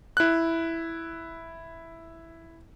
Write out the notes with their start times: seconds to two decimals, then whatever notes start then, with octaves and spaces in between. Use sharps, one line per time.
0.17 E4 F#6